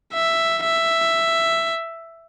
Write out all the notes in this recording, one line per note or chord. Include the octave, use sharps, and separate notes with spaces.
E5
E5